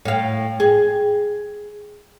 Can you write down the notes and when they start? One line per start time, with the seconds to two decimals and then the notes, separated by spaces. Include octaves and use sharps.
0.05 A2 F5
0.60 G#4